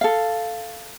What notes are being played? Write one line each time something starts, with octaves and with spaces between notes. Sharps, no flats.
A4 F5